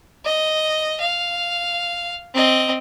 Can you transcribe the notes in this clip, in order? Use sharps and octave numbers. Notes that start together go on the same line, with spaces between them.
D#5
F5
C4 D#5